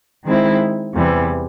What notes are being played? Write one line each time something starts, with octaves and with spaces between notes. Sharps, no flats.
D#3 G#3 C4 E4
E2 C3 E3 G3